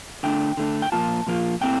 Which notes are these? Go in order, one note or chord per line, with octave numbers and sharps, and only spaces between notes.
D3 A3 D4 G5
D3 A3 D4
G5
A#2 F3 A#3 F4 A5
A#2 F3 A#3 F4
A#2 A3 C4 E4 G5